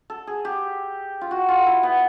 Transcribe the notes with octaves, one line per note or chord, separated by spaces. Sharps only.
A4
G#4
G4
F4
F#4
F4
E4
B3